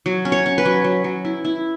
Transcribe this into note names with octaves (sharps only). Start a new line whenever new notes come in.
F#3
C#4
C#5
C#4
B4
F#3
F#3
F#3
E4
E4